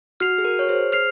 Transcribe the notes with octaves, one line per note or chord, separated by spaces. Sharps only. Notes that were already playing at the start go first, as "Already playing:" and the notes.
F#4 F6 C7 F7
G#4
F#4 A#4
C#5
G#4 C5
F6 C7 F7